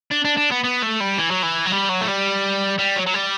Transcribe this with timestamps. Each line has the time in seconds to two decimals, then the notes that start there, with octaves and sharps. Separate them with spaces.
0.11 D4
0.25 D4
0.37 D4
0.52 B3
0.64 B3
0.83 A3
1.01 G3
1.18 E3
1.31 F#3
1.43 E3
1.66 F#3
1.72 G3
1.89 F#3
2.01 A3
2.08 G3
2.79 G3
2.96 F#3
3.06 F#3
3.14 G3